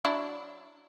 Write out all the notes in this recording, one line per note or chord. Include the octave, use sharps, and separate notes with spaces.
F#3 D4 E4